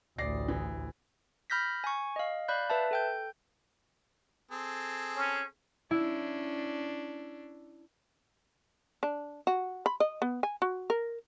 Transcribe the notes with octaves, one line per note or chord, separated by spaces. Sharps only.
A1 D2 D5 A#6 C7
E3
B5 F6 G6 A#6 B6
G#5 C#6
D#5 F5
D5 F5 B5 F#6 G6
B4 E5 A5
A4 G5 G6
C4 G#4 A4
C#4
C#4 D4 E4
D4
F#4
B5
D#5
B3
G#5
F#4
A#4